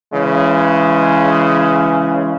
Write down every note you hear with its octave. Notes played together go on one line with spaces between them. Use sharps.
C#3 E3 G#3